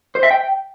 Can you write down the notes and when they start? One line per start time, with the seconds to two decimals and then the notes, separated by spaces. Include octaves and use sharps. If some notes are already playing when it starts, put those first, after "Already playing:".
0.15 C5
0.23 E5
0.31 G5